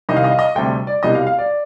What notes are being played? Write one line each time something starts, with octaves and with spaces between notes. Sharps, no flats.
C2 C3 D#3 D#5
F5
D#5
F5
D#5
D2 C3 G3 G5
D5
C2 B2 G3 D#5
F5
F5
D5